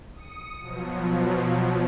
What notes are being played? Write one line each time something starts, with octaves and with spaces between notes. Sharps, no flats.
D#6 C#7
B2 F3 F#3